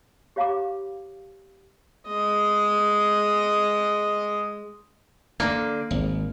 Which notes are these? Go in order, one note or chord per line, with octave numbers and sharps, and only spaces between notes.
G4 C#5 F5 A#5 B5 D6
G#3 D#5
D3 A#3
G#1